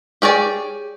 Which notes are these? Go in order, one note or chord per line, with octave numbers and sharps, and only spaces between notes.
G4 G#4 C#5 D5